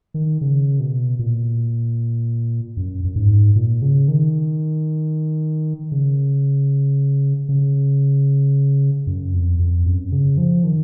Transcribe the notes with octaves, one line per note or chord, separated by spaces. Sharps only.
D#3
C#3
B2
A#2
F#2
F#2
G#2
A#2
C#3
D#3
C#3
C#3
F#2
F2
F2
F#2
C#3
F3
D#3